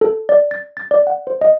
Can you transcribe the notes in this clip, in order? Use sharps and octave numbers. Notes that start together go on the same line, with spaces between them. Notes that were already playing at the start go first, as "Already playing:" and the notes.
A4
D5
A6
A6
D5
F#5
C5
D#5